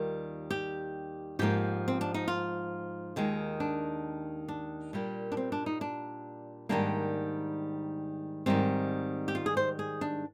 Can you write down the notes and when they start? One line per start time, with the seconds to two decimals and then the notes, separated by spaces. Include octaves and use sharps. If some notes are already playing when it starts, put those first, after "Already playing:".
Already playing: D#2 D#3 G3 A#3 F4
0.51 G4
1.39 G#2 F3 A#3 G4
1.88 C4
2.01 D4
2.14 D#4
2.28 F4
3.16 D#2 D#3 G#3
3.60 D4
4.48 D4
4.93 A#2 G3 A#3
5.32 D4
5.37 C4
5.52 D4
5.66 D#4
5.81 D4
6.69 G#2 D#3 G3 A#3 D4
8.46 G#2 D#3 G3 C4
9.28 G4
9.35 F4
9.46 G#4
9.57 C5
9.79 G#4
10.01 D4